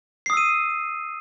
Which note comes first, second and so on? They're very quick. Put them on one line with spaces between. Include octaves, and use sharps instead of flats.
C7 D#6 E6 D#7